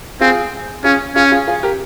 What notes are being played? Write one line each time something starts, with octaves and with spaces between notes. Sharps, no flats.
C4 F4 G#4
C#4 F4 G#4
C#4 F4 G#4
F4 G#4
F4 G#4
G4 A#4